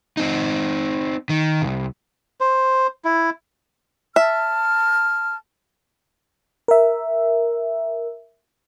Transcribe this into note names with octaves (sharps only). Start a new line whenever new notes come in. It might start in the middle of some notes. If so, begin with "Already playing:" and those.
C4 D#4
D#3
C2
C5
E4
E5 A5 F6
A#4 E5